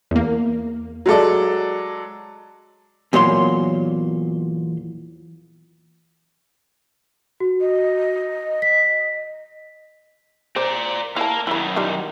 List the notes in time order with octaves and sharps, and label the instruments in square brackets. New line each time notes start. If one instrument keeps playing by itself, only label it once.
[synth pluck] E2 A#3
[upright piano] F#3 G#3 A4 D5
[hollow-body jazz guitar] E2 A#2 F#3 C#5 C6
[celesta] F#4
[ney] D#5
[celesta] B6
[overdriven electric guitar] A#4 D5 [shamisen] C5
[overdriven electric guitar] A#3 A#4 [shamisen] E4 A5
[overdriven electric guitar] F#2 D#3 [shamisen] E4 B5
[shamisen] G3 D#4 F4